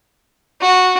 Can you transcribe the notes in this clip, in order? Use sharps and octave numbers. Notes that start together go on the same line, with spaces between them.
F#4